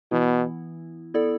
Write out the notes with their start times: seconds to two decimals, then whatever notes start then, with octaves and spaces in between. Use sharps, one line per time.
0.11 B2 E3 B3 E4
1.14 B3 E4 A4 D5